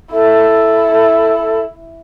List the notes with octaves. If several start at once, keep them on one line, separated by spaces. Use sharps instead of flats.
E4 A4